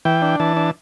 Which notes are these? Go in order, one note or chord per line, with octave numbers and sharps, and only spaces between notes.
E3 G5
D4
E3 A5
D4